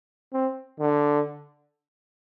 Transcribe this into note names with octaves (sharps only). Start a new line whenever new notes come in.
C4
D3